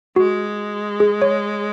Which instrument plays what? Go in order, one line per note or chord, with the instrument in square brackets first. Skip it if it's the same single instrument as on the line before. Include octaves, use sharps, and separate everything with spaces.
[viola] G#3 [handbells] F#4
[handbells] G#4
C#5